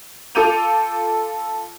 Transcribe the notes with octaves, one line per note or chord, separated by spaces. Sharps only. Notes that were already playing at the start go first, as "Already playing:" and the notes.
F4 A4 D6 G6 D#7 F7